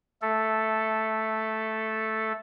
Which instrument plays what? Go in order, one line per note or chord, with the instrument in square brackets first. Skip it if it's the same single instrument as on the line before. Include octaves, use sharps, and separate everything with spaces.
[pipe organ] A3 A4